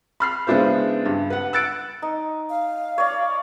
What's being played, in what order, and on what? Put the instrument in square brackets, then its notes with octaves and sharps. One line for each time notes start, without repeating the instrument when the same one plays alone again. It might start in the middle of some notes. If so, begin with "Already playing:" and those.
[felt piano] B5 F6 C7
C#3 G#3 B3 D4 E4 C5
G2
B4 F#5
E6 F#6 A6 C#7 D7
[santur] D#4
[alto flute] F5
[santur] C#5 D5